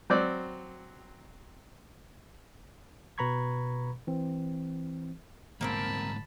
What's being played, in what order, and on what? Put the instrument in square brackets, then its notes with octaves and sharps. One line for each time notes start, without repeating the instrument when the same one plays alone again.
[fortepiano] F#3 C4 D5
[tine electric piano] B2 B4 A#5 B5 C#6 G#6
E3 C4
[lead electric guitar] D2 G#2 [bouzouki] A#3 C4 A#4 [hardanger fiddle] A5 B5